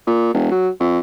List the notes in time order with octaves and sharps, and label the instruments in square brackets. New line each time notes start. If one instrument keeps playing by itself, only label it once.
[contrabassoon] A#2
E1
F#3
F2